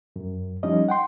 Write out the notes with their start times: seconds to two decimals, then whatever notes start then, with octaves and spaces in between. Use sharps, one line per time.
0.16 F#2
0.63 F3 G3 C#4 D#4 D#5
0.88 F#5 G5 C6